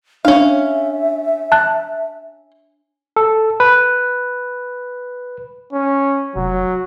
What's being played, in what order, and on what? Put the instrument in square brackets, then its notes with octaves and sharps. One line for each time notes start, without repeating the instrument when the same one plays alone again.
[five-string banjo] C#4 F5 [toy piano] D4 [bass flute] E5
[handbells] A5 F#6
[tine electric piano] A4
B4
[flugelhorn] C#4
[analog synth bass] F1 [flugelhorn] F#3